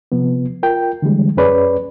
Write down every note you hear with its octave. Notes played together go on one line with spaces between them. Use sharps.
C3 F3 B3
F4 A#4 G5
D3 E3 G3 G#3
F#2 C#4 G#4 B4 C#5 D5